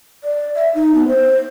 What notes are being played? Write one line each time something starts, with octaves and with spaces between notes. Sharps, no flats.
D5
E5
D#4
B3
C5